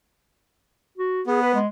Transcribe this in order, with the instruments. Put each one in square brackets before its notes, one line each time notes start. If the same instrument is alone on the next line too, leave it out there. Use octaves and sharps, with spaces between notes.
[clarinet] F#4
[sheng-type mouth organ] B3 [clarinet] G#4
[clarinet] B4
G#3